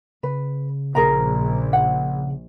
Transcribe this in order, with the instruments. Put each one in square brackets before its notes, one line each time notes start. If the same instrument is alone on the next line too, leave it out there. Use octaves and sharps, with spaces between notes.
[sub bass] C#3 [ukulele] B4
[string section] A#1 [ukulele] G#4 A#4 A#5
[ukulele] F#5